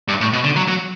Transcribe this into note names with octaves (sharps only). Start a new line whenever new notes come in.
G2
A2
B2
D3
F#3
F#3